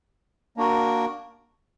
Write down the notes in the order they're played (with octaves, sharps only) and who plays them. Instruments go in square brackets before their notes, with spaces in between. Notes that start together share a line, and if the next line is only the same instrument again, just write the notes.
[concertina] A#3 D4 F#4 A#4